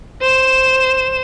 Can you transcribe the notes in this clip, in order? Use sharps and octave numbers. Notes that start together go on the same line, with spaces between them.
C5 E7